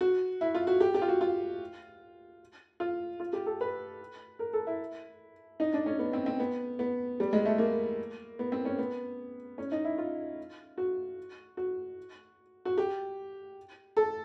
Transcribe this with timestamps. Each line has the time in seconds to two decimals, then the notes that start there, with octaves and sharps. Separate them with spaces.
0.01 F#4
0.41 E4
0.55 F4
0.67 F#4
0.80 G4
0.94 G4
1.02 F4
1.08 F#4
1.21 F4
2.80 F4
3.20 F4
3.33 G4
3.46 A4
3.61 B4
4.39 A#4
4.53 A4
4.67 E4
5.60 D#4
5.73 D4
5.86 C#4
5.99 B3
6.13 C4
6.26 C4
6.40 B3
6.79 B3
7.20 G3
7.33 G#3
7.46 A3
7.58 A#3
8.39 B3
8.52 C4
8.65 C#4
8.78 B3
9.58 C#4
9.72 D#4
9.85 E4
9.98 F4
10.78 F#4
11.57 F#4
12.65 F#4
12.78 G4
13.97 A4